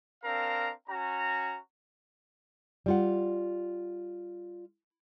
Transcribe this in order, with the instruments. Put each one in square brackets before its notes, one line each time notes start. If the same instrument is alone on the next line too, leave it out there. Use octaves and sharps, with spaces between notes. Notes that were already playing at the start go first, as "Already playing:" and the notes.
[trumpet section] C4 D4 A#4 F5 A#5
C#4 F#4 A#5
[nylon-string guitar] G3 F4 F#5